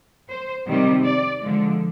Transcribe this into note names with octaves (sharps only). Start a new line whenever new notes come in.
C5
C3 D#3 G3
D5
D3 F3 G#3